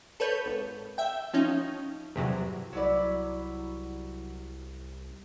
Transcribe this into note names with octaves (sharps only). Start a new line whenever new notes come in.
A4 B4 C#5 G6
G#1
E5 G5
F3 C#4 D#4
E2 G2 C3 F#3
C2 F#3 E4 D5